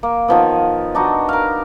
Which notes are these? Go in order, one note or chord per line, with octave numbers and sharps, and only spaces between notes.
A#3
D#3 F3 B3
D4 D#4 F#4
A#4 F5